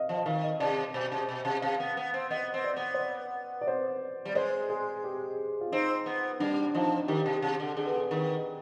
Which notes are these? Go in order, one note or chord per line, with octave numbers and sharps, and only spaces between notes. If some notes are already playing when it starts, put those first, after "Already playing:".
Already playing: D#5 F5
F3
D#5
D#3 F5
D#5
C3 D5
B2
C3
B2
C3
C3 F5
B3
B3
C4
B3 D#5
C4
D5
B3
C5
D5
D5
C5
G3 D5
G#3 C5
G#4
G4
F4
C4 D#4
B3
G3 D4
F3 D#4
D#3 G4
C3
C3
D3
D3 G#4
B4
G#4
D#3 B4